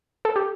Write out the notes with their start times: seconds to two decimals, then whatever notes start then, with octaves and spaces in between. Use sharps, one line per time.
0.25 A4
0.36 G4